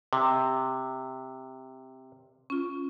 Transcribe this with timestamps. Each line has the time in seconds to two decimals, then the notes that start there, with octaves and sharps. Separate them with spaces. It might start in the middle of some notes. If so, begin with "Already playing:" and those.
0.13 C3
2.50 C#4 F4